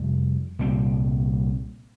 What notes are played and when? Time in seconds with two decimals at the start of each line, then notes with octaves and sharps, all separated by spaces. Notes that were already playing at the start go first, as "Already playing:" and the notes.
Already playing: F2 C3 G3
0.59 C2 A#2 G3 C4